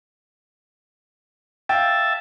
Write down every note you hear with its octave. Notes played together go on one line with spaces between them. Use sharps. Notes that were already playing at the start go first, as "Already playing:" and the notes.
E5 F5 G5 A5